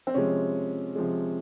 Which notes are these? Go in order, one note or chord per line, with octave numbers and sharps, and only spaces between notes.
C4
C3 F3 G#3 C#4
C3 F3 G#3